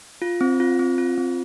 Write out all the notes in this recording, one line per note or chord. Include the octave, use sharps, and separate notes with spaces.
F4
C4
F4
C4
F4
C4